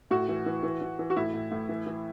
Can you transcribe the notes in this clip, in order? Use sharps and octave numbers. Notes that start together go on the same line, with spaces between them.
A2 F#4
E3
E3
E3
E3
E3
F#4
A2 E4
A2
A2
E3
E3